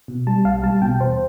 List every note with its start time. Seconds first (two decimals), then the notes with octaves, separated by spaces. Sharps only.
0.08 B2
0.27 G3 A5
0.45 B1 F5
0.63 G3 A5
0.82 B2 G5
1.00 E2 C5